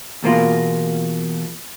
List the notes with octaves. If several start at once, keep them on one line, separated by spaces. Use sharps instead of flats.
E2 B2 A#3 F4